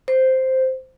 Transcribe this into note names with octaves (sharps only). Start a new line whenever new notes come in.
C5